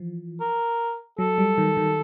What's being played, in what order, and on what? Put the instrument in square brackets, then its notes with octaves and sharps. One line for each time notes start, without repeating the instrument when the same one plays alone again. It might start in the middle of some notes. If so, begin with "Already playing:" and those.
Already playing: [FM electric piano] E3 F3
[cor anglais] A#4
[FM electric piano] F#3 [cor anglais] A4
[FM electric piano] G3
D#3
D#3